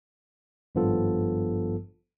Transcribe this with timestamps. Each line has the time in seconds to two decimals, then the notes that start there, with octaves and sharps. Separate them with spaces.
0.75 G#1 G2 F3 B3 F4 A4